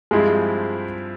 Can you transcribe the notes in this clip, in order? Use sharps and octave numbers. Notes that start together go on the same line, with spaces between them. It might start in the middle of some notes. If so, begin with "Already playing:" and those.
G2 F3 G#3 C4 E4